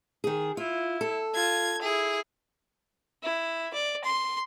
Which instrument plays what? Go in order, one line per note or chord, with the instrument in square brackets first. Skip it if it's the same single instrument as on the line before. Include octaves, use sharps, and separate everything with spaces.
[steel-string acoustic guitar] D#3 G#4
[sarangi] E4 [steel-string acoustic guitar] F4
[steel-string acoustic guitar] A4
[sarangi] F4 [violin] G#6
[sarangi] E4 [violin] G#4
[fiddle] E4
D5
C6